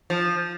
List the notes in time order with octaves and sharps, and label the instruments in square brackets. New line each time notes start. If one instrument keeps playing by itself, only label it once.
[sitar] F3